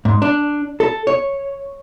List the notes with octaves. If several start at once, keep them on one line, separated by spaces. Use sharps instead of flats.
G#2
D4
A4
C#5